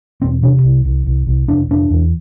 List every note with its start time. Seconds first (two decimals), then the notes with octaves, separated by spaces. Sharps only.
0.22 E1 C4
0.43 C3 D4
0.63 C2
0.85 C2
1.06 C2
1.27 C2
1.48 F1 D4
1.69 F1 D4
1.90 E2